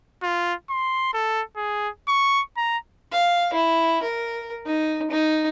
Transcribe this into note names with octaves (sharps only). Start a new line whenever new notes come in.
F4
C6
A4
G#4
C#6
A#5
F5
E4
A#4
D#4
D#4